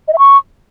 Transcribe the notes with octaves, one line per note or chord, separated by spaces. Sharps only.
D#5
E5
C#6